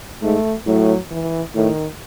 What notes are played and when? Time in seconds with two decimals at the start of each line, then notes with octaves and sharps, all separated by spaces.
0.23 G#2 A3
0.66 A2 F#3
1.11 E3
1.55 A2 D#3